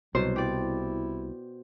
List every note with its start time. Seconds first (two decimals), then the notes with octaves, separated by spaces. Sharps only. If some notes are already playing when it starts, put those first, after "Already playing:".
0.15 C2 B2 F#3 C5
0.36 E4 G4 D5